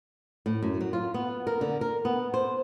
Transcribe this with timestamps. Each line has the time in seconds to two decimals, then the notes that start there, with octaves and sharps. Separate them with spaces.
0.46 A2
0.62 F#2
0.81 F#3
0.93 F4
1.14 B3
1.47 A#4
1.61 D3
1.81 A#4
2.05 B3
2.34 C5